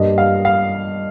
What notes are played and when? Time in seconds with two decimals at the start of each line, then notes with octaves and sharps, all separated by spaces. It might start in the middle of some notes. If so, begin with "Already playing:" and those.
Already playing: G2 G3 A#3 D#5
0.18 F5
0.45 F5